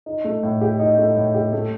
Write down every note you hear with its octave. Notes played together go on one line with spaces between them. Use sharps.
D#4
A3
A2
G4
D#4
A3
A2
G4
A3